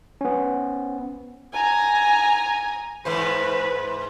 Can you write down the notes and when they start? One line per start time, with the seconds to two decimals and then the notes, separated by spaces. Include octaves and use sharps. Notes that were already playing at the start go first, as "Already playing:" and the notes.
0.21 B3 C#4
1.53 G#5 A#5
3.05 G#2 E3 B4 C5